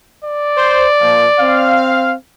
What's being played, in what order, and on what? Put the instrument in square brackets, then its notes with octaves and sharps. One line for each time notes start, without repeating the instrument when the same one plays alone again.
[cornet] D5
[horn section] C5
A#2 F3
C4 F5